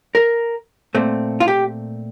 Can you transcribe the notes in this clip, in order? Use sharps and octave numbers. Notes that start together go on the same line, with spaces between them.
A#4
A#2 A3 C4
F4
G4